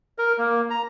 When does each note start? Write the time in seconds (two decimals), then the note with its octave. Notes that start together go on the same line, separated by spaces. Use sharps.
0.19 A#4
0.38 A#3
0.70 A#5